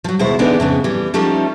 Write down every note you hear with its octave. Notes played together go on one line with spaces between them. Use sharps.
F3 F#3
D#2 B2 G#3 E4 C5
D3 E3 G#3 B3 D4 D#4
F2 C#3 B3
E3 G3
F3 G3 A3 B3 C#4 D#4